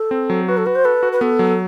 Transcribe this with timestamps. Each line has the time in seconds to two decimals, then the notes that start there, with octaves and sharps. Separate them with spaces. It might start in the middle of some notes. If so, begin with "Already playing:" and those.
Already playing: A4
0.11 C4
0.30 F#3
0.48 F#4 B4
0.57 A4
0.66 F#4 B4
0.75 C5
0.85 A4 B4
1.03 F#4
1.12 B4
1.21 B3 A4
1.39 F#3